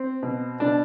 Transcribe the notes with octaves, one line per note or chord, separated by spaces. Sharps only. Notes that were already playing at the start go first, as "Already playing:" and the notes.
Already playing: C4
B2
B2 D4